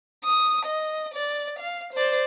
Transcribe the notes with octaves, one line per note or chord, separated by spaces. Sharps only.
D#6
D#5
D5
F5
C5 D5